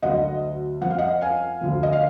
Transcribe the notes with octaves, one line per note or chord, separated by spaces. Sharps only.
D2 D3 F#3 D#5 F#5
F2 F3 F#5
F5
D#5 F#5
F5 G#5
D2 D3 F3
D#5
F5